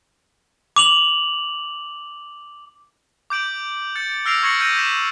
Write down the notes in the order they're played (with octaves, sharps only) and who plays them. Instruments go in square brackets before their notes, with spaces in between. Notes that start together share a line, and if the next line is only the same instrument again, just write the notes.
[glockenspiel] D6 F7 F#7
[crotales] D6 G6 D7 F#7
G6 A6 C#7
E6 F6 A#6 C7 D7 F7
C#6 G#6 A#6 C7 C#7 F#7
E6 F6 G6 A#6 D#7
G6 G#6 B6 E7